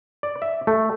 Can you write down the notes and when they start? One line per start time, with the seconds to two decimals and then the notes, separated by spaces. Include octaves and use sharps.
0.23 D5
0.42 E5
0.67 A3